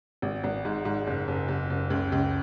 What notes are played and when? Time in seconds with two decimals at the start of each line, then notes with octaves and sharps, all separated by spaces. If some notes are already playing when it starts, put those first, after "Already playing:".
0.22 G#1
0.44 G#1
0.65 G#2
0.85 G#2
1.07 F#1
1.28 F#1
1.48 F#1
1.70 F#1
1.90 C#2
2.12 C#2